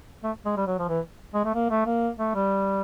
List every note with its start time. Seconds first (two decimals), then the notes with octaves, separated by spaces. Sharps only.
0.23 A3
0.45 G#3
0.57 G3
0.67 F#3
0.79 F3
0.88 E3
1.34 G#3
1.45 A3
1.54 A#3
1.71 A3
1.86 A#3
2.19 A3
2.35 G3